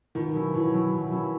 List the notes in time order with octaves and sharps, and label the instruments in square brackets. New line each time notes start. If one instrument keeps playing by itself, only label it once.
[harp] B2 [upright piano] D#3
[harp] F#3 C#4 E4
[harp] B2 [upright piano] E3
[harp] F#3 C#4 E4
B2
F#3 C#4 E4